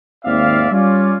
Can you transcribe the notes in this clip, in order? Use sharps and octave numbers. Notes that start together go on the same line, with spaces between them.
G#1 D#2 C4 D5 E5 F5
G3 C#4 F4 D5